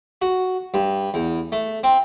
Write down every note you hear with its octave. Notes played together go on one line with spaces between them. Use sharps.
F#4
G2
E2
A3
C4